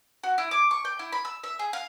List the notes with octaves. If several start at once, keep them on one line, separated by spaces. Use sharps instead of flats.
F#4
E4
D6
C#6
G5
E4
B5
E6
E5
G#4
F5